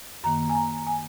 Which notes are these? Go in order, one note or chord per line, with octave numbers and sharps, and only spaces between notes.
F#2 D#3 A#3 A#5
G#5
A#5
G#5